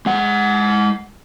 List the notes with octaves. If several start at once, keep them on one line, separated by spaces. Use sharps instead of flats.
G#3 F#5